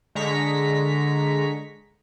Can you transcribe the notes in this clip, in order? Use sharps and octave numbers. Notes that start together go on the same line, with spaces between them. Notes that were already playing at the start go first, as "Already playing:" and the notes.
D3 G#3 A#5 C#6 B6